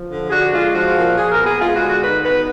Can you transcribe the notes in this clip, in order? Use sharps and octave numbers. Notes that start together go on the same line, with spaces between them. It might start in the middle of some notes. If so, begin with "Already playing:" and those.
Already playing: F3
D3
G#4
D4 F#4
G#3 F4
F3 F#4
A#2
A#2 G#4
A#4
B3
G#4
G#3 F4
F#4
D3
F#4
D#4 B4
B3 B4